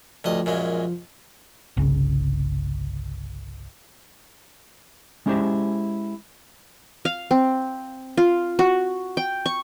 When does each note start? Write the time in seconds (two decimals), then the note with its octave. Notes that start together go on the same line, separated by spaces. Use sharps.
0.24 D2 G2 F3 D#5
0.46 F#2 A#2 G#3
1.77 G1 C2 C#3
5.26 G#3 C#4 E4 G4 G#4 C5
7.05 F5
7.31 C4
8.17 F4
8.59 F#4
9.17 G5
9.46 C#6